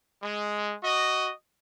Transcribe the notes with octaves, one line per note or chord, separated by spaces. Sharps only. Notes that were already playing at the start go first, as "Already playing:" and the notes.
G#3
F#4 D#5